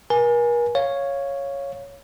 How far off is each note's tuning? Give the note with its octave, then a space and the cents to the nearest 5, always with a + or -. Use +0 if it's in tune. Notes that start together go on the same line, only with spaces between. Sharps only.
A#4 +40 G#5 +0
C#5 +0 F5 +0